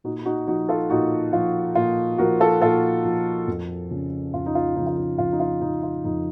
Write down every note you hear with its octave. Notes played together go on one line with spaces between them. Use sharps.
A#2 D#4 F#4
D#4 F#4
F3 D#4 F#4
F4 A4
A#2 D#4 F#4
F3 F4
A#2 F4
F3 F#4 A#4
F4 A4
A#2 F4 A4
F3
F2
C#3 F3
F2 F4
D#4
F4
C#3 F3 D#4
F4
D#4
F2 F4
D#4
F4
C#3 F3 D#4
F4
F2 D#4